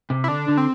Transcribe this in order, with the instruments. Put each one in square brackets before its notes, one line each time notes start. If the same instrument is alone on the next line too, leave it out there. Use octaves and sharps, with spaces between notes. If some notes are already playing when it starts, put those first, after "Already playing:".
[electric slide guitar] C3
[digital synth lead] E4
[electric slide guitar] D3 [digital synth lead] D4
[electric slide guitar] D3
[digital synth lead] C4